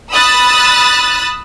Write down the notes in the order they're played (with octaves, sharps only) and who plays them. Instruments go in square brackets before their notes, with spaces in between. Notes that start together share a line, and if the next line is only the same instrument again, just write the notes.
[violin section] B5 D#6 E6 F#6 A6